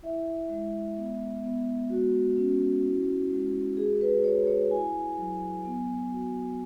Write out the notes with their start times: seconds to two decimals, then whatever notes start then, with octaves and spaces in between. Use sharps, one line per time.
0.02 E4 E5
0.49 G#3
0.97 B3
1.43 B3
1.90 G#3 F#4
2.37 C#4
2.84 E4
3.31 G#3
3.77 F#4 G#4
4.01 B4
4.24 F#4 C#5
4.47 C#5
4.70 E4 G#5
5.18 F#3
5.65 B3
6.11 F#4